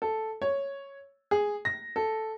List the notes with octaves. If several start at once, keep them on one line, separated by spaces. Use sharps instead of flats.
A4
C#5
G#4
A#6
A4